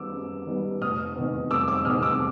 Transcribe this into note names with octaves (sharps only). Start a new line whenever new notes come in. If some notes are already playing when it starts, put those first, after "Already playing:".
Already playing: F#2 D#3 G3 B3 D6 E6
F#2
D#3 G3 B3
F1 D#6 F6
E2 C3 D#3
F1 D6 E6
D6 E6
E2 C3 D#3 D#6 F6
D6 E6